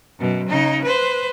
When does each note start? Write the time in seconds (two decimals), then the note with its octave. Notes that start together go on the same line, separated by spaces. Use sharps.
0.19 F#2 B2
0.49 C#3 D#4
0.84 B4 C5